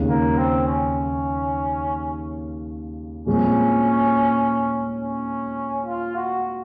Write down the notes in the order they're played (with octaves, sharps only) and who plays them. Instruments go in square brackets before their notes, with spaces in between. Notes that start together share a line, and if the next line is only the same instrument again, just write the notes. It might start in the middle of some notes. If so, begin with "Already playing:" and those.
Already playing: [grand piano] D#2 C#3 G#3
[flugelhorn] A#3
C4
C#4
[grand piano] A#2 F3 G#3 C4 [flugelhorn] C#4
[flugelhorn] C#4
F4
F#4